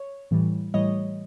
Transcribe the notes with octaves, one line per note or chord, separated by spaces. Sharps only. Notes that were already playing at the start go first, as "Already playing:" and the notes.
Already playing: C#5
A2 E3 G3
A2 E3 G3 C#5 D#5